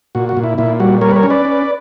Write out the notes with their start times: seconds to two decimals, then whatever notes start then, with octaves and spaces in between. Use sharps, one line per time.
0.15 A#2 F#4
0.29 F#4
0.37 A#2
0.44 E4
0.58 A#2 E4
0.80 G3 F#4
1.01 G3 A#4 C#5
1.11 B4
1.16 A#4 C#5
1.23 C#4
1.30 B4 D5
1.45 C#4